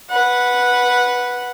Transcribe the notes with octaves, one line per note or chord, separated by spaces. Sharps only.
B4 F#5